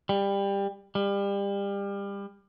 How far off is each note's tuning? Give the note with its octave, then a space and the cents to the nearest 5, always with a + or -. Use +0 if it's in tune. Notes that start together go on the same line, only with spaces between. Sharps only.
G3 +20
G3 +30